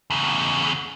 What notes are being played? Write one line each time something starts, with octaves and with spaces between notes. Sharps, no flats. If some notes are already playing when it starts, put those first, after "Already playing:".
E2 C#3